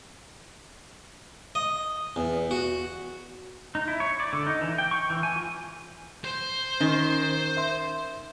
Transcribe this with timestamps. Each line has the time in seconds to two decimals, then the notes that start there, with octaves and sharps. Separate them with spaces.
1.55 D#5
2.16 E2
2.51 F#4
3.75 D#4
3.88 E4
4.00 C#5
4.20 D5
4.33 D3
4.47 D#4
4.61 E3
4.78 G5
4.91 C#6
5.10 E3
5.23 G#5
5.36 F4
6.24 C5
6.81 D#3 C#4
7.57 E5 C6